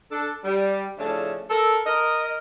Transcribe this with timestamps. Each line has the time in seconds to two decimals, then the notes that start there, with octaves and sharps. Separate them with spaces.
0.12 D4 A4
0.44 G3
0.99 A2 C#3 F3 A3 D4 A4
1.50 A4 A#4
1.87 A#4 D#5